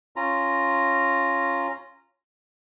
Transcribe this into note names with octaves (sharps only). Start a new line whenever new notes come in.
C#4 F4 A#5